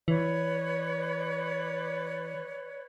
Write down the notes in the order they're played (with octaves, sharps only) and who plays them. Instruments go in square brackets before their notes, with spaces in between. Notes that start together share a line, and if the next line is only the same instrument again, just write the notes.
[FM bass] E3 [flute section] B4 C#5 D5